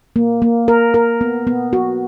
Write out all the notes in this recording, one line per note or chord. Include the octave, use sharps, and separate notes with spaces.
A#3
A#3
A#4
A#4
B3
B3
F#4